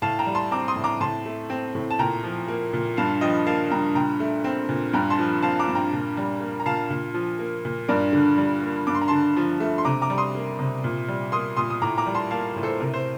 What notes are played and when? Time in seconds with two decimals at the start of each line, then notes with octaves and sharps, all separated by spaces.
0.02 A2 F5 A5
0.19 G5 A#5
0.26 G3
0.35 A5 C6
0.51 C4 A#5 D6
0.68 C6 D#6
0.76 A2
0.84 A#5 D6
1.00 A2 A5 C6
1.25 A3
1.50 C4
1.75 A2
1.91 A5
1.99 A#2 G5 A#5
2.24 F3
2.48 A#3
2.73 A#2
2.97 G2 F5 A5
3.21 F3 D#5 G5
3.47 A#3 F5 A5
3.70 G2 G5 A#5
3.95 A#2 G5 A#5
4.20 A3
4.44 C4
4.69 A#2
4.93 G2 G5 A#5
5.10 A5 C6
5.19 F3
5.43 C4 F5 A5
5.59 A#5 D6
5.68 G2
5.75 G5 A#5
5.93 A#2
6.17 G3
6.41 A#3
6.60 A#5
6.66 A#2 F5 A5
6.90 A#2
7.14 F3
7.39 A#3
7.65 A#2
7.88 G2 A#4 D5
8.13 D3
8.37 G3
8.63 A#3
8.87 G2 D6
8.95 C6
9.01 A#5
9.08 D3 A5 C6
9.37 F3
9.60 A3
9.78 C6
9.85 C3 A#5 D6
10.02 A#5 D6
10.10 G3
10.18 C6 D#6
10.35 A#3
10.59 C3
10.84 A#2
11.08 G3
11.32 A#3 C6 D#6
11.57 A#2 C6 D#6
11.70 D#6
11.82 A2 A#5 D6
11.98 A#5 D6
12.06 G3
12.15 A5 C6
12.31 A#3 F5 A5
12.56 A2
12.63 A4 C5
12.80 C3 A#4
12.94 C5